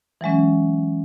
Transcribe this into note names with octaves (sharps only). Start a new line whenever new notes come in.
E3 F#3 G#3 C#4